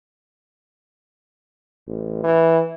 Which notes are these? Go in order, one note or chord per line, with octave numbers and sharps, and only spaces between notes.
A1
E3